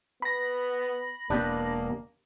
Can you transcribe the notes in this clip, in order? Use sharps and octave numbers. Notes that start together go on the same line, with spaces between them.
B3 B5 A#6
E1 A#3 B3 D4 G4